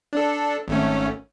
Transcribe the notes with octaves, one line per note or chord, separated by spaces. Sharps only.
D4 A4
G#1 A3 C#4